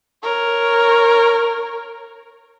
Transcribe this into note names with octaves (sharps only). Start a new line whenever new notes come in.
A#4 C#5